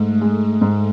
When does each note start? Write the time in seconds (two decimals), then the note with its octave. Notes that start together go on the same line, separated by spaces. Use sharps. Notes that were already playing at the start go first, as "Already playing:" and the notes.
Already playing: G#2 A3
0.21 G#3
0.61 G#2